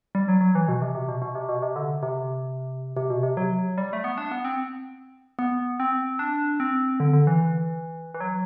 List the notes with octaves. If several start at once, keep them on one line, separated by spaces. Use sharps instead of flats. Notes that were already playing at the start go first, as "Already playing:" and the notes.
G3
F#3
F#3
E3
B2
C3
C3
B2
B2
C3
B2
C3
D3
C3
C3
B2
C3
F#3
G3
A3
B3
D4
B3
C4
B3
C4
D4
C4
D3
D3
E3
E3
F#3